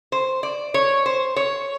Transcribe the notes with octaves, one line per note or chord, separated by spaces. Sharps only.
C5
D5
C#5
C5
C#5